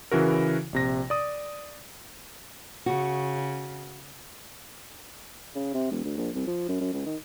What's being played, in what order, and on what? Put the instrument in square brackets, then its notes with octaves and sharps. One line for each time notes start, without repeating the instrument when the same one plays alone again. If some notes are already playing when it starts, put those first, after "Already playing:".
[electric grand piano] C#3 E3 E4 F#4 A#4
A#1 C3 A#6
D5 D#6
[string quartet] C#3 [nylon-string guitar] F#4
[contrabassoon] C#3
C3
E1
D2
A#1
C2
F3
F#2
F#2
C#2
D#3